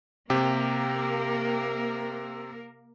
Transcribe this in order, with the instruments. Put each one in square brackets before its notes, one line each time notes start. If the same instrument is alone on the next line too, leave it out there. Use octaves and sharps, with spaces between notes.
[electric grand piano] C3 G4 [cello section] A#3 A#4